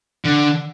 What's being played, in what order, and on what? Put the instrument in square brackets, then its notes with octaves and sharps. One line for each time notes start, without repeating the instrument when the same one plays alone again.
[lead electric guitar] D3